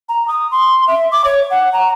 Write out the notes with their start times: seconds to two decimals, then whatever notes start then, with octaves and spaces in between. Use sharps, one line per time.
0.09 A#5
0.28 D#6
0.51 C6
0.88 E5
1.12 D6
1.24 C#5
1.50 F#5
1.73 A#5